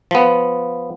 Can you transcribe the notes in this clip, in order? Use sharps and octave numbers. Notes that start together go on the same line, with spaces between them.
F3 B3